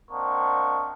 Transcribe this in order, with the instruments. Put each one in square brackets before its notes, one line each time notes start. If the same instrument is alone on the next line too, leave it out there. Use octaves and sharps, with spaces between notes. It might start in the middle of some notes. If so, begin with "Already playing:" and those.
[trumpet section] A#3 C4 D4 D#5 F#5 C#6